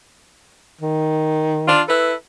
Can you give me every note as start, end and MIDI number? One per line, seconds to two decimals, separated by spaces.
0.81 1.85 51
1.66 1.80 62
1.66 1.80 65
1.88 2.12 64
1.88 2.12 69
1.88 2.12 71